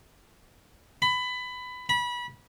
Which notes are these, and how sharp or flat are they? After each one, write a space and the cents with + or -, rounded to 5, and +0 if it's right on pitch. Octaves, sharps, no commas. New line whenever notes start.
B5 +20
B5 -25